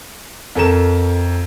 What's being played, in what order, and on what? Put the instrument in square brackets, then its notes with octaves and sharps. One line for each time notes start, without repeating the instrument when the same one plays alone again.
[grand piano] F2 A4 A#4 A5 E7